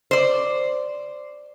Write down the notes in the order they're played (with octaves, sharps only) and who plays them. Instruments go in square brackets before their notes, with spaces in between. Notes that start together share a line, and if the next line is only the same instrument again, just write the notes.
[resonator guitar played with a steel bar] C5 D5